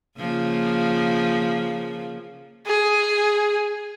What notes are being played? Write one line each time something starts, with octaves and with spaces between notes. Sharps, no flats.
C#3 F3 A#3
G#4